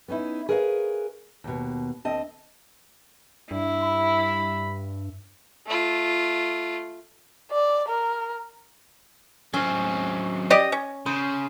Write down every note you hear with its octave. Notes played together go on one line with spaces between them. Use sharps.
B3 C#4 D#4 E4
G#4 A#4 B4 C#5 D5 F5
D#2 B2
D2 C4 D#5 A5
G2 E4
B5
A3 F4
D5
A#4
F#3 C4 C#4
G4 D5 D#5
C#4
C#3 C5